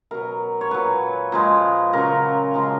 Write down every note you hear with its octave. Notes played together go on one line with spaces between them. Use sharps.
B2 F#3 A#4
C#5
A#2 F#3 B4
A#2 F3 G#3
C#3 F#3 A#4
C#3 F3 G#3